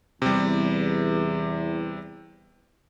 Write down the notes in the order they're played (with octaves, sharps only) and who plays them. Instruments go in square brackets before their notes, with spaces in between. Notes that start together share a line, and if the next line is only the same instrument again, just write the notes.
[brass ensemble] E2 [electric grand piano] C3 G3